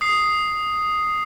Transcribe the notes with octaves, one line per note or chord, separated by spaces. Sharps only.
D#6 C7